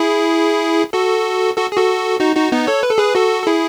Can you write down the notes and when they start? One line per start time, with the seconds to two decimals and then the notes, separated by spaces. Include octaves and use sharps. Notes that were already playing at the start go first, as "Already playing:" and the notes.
Already playing: E4 G#4
0.93 F#4 A4
1.57 F#4 A4
1.72 G#4
1.77 F#4 A4
2.20 D#4 F#4
2.35 D#4 F#4
2.52 B3 D#4
2.67 A4 C#5
2.83 B4
2.91 A4
2.98 G#4 B4
3.15 F#4 A4
3.43 A4
3.47 E4 G#4